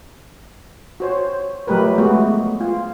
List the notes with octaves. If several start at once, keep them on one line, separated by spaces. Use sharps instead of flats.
F#4 C5 C#5
F3 F#3 A3 G4 A#4 B4
G#3 A3 B3 F#4
F4